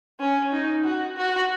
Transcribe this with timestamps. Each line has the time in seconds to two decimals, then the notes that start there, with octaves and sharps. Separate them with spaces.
0.20 C#4
0.52 D#4
0.84 F#4
1.17 F#4